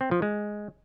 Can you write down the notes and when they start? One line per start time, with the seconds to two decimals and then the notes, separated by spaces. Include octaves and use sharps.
0.01 C4
0.11 F3
0.22 G#3